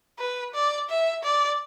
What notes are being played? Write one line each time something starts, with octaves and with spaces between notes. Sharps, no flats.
B4
D5
E5
D5